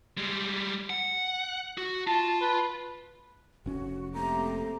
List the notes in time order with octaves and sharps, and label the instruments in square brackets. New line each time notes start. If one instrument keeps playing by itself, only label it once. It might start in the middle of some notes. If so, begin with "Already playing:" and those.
[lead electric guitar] G3 G#3
F#5
F#4
[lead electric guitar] F4 [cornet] A5
[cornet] B4
[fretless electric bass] F1 C#4 [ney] F#4
[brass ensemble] A3 [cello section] A#3 C4 G4 [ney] A#5